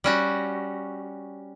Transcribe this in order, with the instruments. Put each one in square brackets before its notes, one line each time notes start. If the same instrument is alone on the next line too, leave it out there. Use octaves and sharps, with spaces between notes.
[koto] G3 C#4 F#4